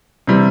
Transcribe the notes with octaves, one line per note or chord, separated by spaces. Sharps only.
C3 E3 G3